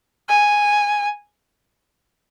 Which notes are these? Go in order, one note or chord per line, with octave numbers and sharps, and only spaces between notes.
G#5